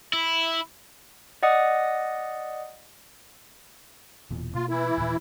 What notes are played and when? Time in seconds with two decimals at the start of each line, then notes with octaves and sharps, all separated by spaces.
0.13 E4
1.43 D5 D#5 F#5 D#6
4.31 E1 E2 A#2
4.55 B2 A#3 F4
4.69 E3 E4
4.98 D#1 A#2